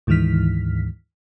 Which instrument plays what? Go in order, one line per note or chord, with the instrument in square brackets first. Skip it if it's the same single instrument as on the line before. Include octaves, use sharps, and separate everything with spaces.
[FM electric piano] D2 G#2 D#3 E3 F6 B6